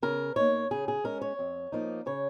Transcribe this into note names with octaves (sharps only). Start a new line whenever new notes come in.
C#3 A#4
A#3 D#4 C#5
C#3 G#4
G#4
G#3 C#4 A#4
C#5
F2
F3 A#3 D#4
C#3 C#5